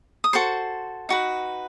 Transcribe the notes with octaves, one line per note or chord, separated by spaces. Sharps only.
D#6
F#4 A4 C5 C6
D#4 F#4 B4